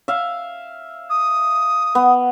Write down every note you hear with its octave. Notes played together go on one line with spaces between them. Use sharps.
E5 F5
D#6
B3